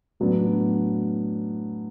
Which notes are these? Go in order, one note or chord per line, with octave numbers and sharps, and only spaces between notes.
A2 F#3 B3 D4